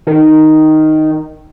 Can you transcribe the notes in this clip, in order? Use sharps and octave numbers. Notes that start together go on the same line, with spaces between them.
D#3